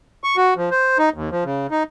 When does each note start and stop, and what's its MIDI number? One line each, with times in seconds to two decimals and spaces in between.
0.24 0.36 85
0.37 0.54 66
0.56 0.69 53
0.71 0.98 72
0.99 1.09 63
1.14 1.29 39
1.31 1.44 53
1.45 1.67 49
1.71 1.83 63